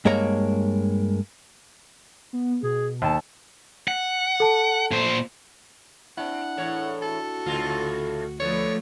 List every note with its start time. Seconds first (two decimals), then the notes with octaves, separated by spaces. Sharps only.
0.05 G2 G#3 A#3 C#5 A#5
2.33 B3
2.63 B2 G#4
3.02 D#2 A5
3.88 F#5
4.40 A4 A5
4.92 A#2 C5
6.17 C4 D4 E4 F#5
6.57 E2 A2 C#5
7.02 F#4 A4
7.46 D2 A2 C#3 F4
8.40 D3 F3 A3 B3 C#5